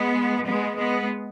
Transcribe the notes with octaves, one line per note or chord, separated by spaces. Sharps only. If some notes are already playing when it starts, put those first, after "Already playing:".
Already playing: G#3 B3
G#3 B3
G#3 B3